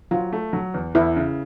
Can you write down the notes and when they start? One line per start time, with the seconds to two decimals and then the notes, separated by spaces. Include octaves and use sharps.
0.11 F#3 F4
0.33 A3
0.53 F#3
0.74 E2
0.95 E2 E4
1.16 C#3